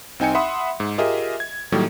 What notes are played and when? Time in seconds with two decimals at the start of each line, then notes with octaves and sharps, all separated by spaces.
0.19 C2 C4 D#4 G5 G#5 C#7
0.35 E5 F#5 B5 C6 D#6
0.80 G#2
0.98 F4 G4 G#4 A#4 D#5 E5
1.40 G#6
1.72 A2 D#3 F#3 G3 A3 A#3